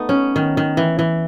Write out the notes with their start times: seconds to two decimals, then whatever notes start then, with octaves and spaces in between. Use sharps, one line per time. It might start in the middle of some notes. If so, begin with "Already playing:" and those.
Already playing: A3 B3 D#4
0.09 C#4
0.36 D#3
0.57 D#3
0.77 E3
0.99 E3